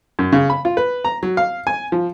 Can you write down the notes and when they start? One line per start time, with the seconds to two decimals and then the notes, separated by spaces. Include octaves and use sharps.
0.19 F#2
0.32 C#3
0.50 B5
0.65 F4
0.77 B4
1.05 A#5
1.23 F#3
1.37 F5
1.67 G#5
1.92 F3